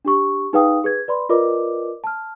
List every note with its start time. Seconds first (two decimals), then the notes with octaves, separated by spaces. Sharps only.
0.05 D4 G4 C#6
0.53 D#4 G#4 B4 F5 G5 D#6
0.84 G#4 B4 G#6
1.08 B4 D5 B5 C6
1.29 F4 A#4 B4 D5 D#5 D6
2.04 A5 F6